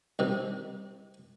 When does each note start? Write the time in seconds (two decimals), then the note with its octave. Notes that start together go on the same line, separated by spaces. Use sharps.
0.19 C2 C3 D#3